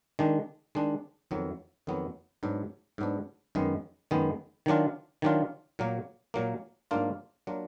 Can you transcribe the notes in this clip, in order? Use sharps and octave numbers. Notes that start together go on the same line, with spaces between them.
D#3 G#3 D4
D#3 G#3 D4
F2 D#3 F#3 B3
F2 D#3 F#3 B3
G#2 F#3 B3 D4
G#2 F#3 B3 D4
F#2 D#3 G#3 B3
F#2 D#3 G#3 B3
D#3 F#3 D4 F4
D#3 F#3 D4 F4
A#2 F#3 A#3
A#2 F#3 A#3
G#2 F#3 A#3 D4 F4
F#3 A#3 D4 F4